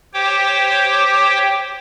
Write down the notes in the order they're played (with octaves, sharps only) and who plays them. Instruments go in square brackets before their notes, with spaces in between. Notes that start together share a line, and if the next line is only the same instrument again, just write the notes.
[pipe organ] G4 C5 C#5 G5 D6